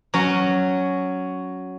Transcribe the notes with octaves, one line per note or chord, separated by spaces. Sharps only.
F#3 C#4